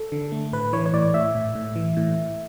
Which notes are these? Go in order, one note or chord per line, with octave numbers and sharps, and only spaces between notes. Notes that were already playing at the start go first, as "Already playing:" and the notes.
Already playing: A4
D3
A3
A2 B4
E3 C#5
C#5
A2 D5
A2 E5
A2
A2
E3
A2